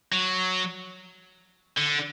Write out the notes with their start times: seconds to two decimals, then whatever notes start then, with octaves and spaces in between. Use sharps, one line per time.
0.12 F#3
1.77 D3